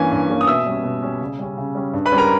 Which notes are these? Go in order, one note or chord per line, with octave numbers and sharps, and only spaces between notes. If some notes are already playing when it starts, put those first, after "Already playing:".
Already playing: G2 E3 A#3 C#4 G#5
G2
E3 A#3 C#4
D#6
B2 E5 E6
G3 C#4
B2
G3 C#4
C#3
G3 C#4
C#3
G3 C#4
G2
B4 B5
G3 C#4
A#4 A#5